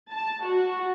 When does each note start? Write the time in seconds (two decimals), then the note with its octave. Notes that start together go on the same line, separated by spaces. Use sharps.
0.11 A5
0.44 F#4